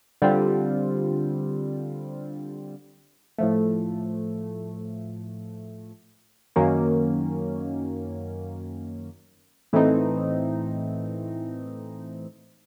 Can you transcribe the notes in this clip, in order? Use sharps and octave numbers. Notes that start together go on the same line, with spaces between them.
D3 G3 C4 F4
A2 F3 A3
F#2 D#3 F#3 A#3 C#4
A2 E3 A3 C4 D#4